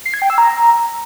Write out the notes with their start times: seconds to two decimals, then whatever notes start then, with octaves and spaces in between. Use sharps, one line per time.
0.05 C7
0.14 G#6
0.22 G5
0.30 E6
0.38 A#5